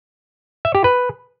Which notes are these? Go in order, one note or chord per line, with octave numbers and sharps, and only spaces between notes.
E5
G4
B4